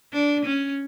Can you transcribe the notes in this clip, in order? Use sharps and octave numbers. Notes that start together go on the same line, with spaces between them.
D4
C#4